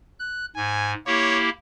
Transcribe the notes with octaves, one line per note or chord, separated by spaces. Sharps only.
F#6
G#2 G#5
A#3 E4 G4 C#5